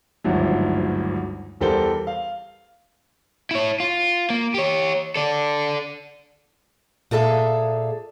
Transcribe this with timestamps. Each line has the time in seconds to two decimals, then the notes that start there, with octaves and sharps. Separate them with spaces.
0.24 G#1 D2 G2 F3 F#3
1.60 E2 G3 A4 A#4 C5 G7
2.07 F5
3.51 E4 C#5
3.80 F4
4.30 A#3
4.54 G4 C#5
5.16 A4 D5
7.11 A#2 G#4 A4 E5 F5